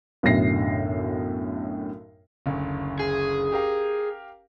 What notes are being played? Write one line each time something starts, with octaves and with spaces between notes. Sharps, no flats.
B1 F#2 A2 D3 A#6 C7
F#1 D2
G#4
G4 A#4 F5